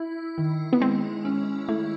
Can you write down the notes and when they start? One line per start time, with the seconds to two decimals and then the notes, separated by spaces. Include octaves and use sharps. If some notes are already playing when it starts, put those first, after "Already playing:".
Already playing: E4
0.38 D#3
0.73 B3
0.80 G#3 C4
1.25 C#4
1.69 A3 E4